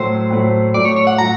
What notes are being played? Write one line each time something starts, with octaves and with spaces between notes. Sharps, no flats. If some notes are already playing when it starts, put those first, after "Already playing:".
Already playing: A2 F#3 A3 C5
A2 F#3 A3
A2 F#3 A3 D5
C#5
C#5
F#5
A2 F#3 A#5